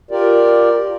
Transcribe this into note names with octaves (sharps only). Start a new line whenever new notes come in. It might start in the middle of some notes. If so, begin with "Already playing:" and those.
F4 G4 A#4 D5